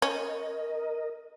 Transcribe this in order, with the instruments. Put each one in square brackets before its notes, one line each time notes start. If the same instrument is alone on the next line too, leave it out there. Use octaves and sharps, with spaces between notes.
[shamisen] C#4 [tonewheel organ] A#4 D#5